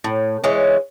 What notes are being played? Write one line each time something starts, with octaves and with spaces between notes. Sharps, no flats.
A2
E3 G#3 C#4